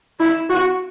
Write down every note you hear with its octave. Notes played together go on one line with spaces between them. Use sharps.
E4
F#4